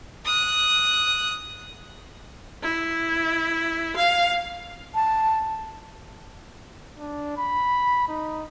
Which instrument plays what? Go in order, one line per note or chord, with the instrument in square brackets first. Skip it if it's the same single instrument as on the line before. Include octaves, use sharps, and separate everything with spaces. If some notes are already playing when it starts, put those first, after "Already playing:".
[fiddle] D#6 F#6
[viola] E4
F5
[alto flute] A5
[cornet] D4
B5
D#4